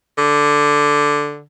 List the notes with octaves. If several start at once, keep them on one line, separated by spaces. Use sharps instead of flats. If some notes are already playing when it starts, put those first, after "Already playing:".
D3